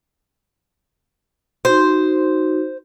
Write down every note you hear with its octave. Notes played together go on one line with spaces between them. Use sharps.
D#4 F#4 C5